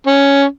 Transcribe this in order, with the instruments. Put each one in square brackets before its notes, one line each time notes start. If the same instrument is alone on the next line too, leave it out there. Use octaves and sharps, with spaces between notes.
[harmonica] C#4